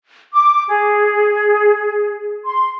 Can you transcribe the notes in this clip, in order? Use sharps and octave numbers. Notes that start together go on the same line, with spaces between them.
D6
G#4
C6